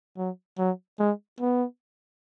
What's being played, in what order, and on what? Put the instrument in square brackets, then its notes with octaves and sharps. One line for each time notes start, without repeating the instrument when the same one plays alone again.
[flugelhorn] F#3
F#3
G#3
B3